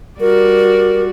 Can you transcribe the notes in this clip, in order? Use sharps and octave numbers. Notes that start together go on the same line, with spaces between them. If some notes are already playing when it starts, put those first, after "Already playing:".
G3 F#4 A#4 D5